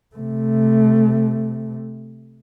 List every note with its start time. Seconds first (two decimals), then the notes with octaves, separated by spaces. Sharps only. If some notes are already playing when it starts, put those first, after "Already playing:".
0.16 C3 A3